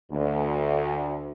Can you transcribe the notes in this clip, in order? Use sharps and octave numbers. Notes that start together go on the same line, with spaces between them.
D2